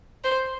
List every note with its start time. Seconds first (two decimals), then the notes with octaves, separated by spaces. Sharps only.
0.24 C5